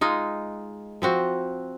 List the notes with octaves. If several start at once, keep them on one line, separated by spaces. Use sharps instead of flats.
G#3 D#4 F4
F3 C4 F#4